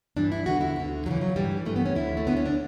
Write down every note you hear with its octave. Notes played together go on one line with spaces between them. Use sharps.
G2 E3 D4
E4
E2 D3 F#4
E4
D2 D3
F#2 C#3 E3 F#3
F#3
G2 E3 G3
G2 E3 A3
B3
C#4
D2 D3 E4
A3
D2 D3 B3
C#4
D4